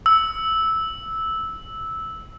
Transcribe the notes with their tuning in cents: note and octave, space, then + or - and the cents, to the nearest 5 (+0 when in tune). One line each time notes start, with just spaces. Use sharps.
E6 -10